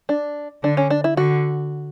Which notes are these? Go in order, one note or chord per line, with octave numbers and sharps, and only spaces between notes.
D4
D3 D4
C#4
D4
E4
D3 F#4